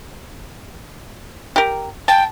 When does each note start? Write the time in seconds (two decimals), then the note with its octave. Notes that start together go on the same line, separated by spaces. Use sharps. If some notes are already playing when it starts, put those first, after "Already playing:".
1.56 G4 A#4
2.08 G5 A5